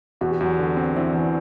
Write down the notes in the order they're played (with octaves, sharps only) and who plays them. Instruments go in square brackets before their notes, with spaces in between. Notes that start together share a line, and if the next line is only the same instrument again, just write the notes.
[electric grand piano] E2 [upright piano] F#4
[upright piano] G4
[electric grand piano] E2 [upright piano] F#3 F#4
[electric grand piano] D3
C4
[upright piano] D4
[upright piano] E3 E4 [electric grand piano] C4
[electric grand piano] E2